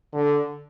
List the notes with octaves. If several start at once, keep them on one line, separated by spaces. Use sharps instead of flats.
D3